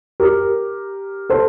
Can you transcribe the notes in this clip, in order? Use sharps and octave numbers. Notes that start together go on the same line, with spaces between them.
G4 A#4
A4 C5